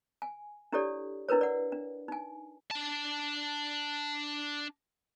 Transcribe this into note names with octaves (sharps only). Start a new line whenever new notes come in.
G#5
D4 E4 G4 A4 C#5 D5
D4 E4 A#4 B4 C#5
D5 F#5
D4
D#4 G#5
D4 A5